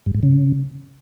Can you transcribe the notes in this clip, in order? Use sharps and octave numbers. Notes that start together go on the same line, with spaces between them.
G2
G#2
C#3